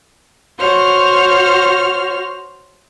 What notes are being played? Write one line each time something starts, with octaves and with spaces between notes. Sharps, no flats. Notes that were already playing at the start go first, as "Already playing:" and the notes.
F#4 C5 C#5 F6